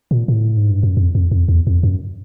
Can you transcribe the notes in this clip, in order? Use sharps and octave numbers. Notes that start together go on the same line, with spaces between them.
A#2
A2
G#2
G2
F#2
F2
F2
F2
E2
F2
F#2